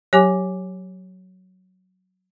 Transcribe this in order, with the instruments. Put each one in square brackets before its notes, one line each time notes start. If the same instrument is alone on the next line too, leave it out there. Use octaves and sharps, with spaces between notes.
[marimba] F#3 G4 [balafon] C#5 G#5 D6